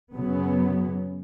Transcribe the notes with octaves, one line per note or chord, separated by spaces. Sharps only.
F#2 C#3 F#3 B3